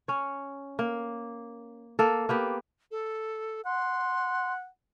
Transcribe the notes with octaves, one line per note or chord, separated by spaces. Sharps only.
C#4 C#5
A#3
A#3 A4
A#3 B3 G4
A4
F#5 C6